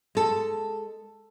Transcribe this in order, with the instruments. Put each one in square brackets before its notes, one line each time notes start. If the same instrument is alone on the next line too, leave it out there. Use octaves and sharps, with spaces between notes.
[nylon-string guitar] G#3 A4